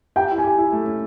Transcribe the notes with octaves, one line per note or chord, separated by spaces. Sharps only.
G4 G5
E4
G#5
G4
E4
A3
C#4